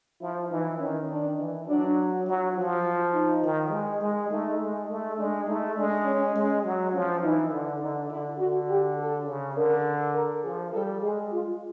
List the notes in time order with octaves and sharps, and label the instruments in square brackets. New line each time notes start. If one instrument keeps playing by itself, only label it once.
[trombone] F3 [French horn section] E4
[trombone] E3 [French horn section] D#4
[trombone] D#3 [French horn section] C#4
[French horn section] D4
[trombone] E3
[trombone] F#3 [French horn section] D4
[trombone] F#3 [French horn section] E4
[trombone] F3 [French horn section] F#4
[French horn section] F4
D#4
[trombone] D#3
G#3
G#3
[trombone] A3 [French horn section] D#4
[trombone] G#3
A3
[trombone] G#3 [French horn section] D4
[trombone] A3 [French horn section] D#4
[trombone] G#3 [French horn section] D4
[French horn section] C#4
[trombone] G#3
F#3
[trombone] F3 [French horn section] C#4
[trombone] E3 [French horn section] D#4
[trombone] D3
[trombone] D3 [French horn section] D#4
[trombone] D3 [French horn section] E4
[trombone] D3 [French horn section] F#4
[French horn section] G4
A4
[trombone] C#3
[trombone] D3 [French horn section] A#4
[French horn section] A#4
[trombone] F3 [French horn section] G#4
[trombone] G3 [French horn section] A4
[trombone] G#3 [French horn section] G#4
[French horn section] F4